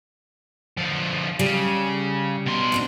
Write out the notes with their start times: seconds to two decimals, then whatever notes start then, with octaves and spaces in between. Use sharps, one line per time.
0.77 D3 F3
1.39 C#3 G3
2.46 B2 C6
2.72 G#2 C4 D4